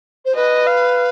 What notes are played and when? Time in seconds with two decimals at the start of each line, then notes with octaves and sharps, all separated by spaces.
0.25 C5
0.35 B4 D#5
0.67 F5